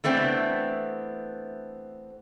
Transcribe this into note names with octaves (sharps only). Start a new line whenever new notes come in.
E3 A3 B3 C4 D4